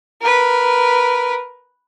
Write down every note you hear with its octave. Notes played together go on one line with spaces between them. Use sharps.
A#4 B4